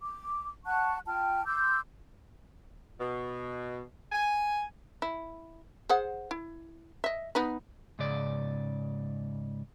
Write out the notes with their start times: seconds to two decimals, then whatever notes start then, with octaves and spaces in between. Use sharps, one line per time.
0.01 D6
0.65 F#5 A5 C#6 F#6
1.07 F4 G5 A5 F6
1.46 C6 D6 E6 G6
3.00 B2
4.12 G#5
5.02 E4
5.89 G#4 C5 F#5
6.31 E4
7.04 D#5 E5
7.35 B3 D#4 B4
7.99 G#2 C#3 D5